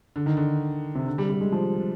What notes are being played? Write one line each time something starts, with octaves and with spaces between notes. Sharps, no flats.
D3
D#3
D3
C3
D3
G3
G3
G#3
F3